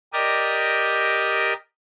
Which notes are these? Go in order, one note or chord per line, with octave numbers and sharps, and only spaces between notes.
G4 A#4 D5 D#5